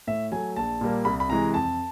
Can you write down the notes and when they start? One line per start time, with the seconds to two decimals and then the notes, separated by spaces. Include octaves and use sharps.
0.07 A2 E5
0.32 F#3 A3 G#5
0.56 A#1 A5
0.81 A#2 G3 A#3
1.05 C2 B5
1.20 B5
1.29 C3 E3 G#3 A#5
1.54 F2 A5